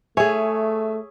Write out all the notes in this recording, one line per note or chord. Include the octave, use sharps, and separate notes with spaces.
A3 G#4 C#5 E5 G#5